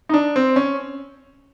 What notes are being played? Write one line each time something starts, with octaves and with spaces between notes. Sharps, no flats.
D#4
D4
C4
C#4